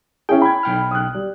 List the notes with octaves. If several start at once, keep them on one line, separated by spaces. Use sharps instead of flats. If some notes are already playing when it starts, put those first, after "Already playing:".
C#4 E4 G#4 G5
B5 G#6
B1 G5 F6
D#6 F#6
G3